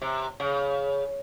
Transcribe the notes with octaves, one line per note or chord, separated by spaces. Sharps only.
C3
C#3